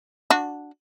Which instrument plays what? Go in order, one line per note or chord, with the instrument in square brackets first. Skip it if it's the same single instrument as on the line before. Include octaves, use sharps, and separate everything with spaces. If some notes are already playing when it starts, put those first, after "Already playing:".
[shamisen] D4 F#4